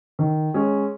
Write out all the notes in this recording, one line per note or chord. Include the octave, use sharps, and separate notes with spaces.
D#3
G#3 C#4